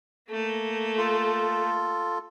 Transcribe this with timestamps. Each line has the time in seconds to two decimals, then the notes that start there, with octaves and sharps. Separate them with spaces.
0.30 A3 A#3
0.98 F4 A4